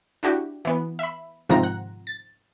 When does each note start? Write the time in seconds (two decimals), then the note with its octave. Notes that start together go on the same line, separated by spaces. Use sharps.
0.23 D4 E4 F#4 G4
0.65 E3 B3
0.99 E5 B5
1.49 G#2 C3 D#3 F3 C4 A#5
1.63 F#5
2.07 A6